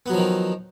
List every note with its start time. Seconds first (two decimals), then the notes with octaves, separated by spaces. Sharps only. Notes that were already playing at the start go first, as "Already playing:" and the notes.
0.06 B3
0.10 F#3
0.14 F3
0.18 D#3